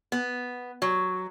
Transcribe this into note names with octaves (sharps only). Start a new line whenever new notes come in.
B3
F#3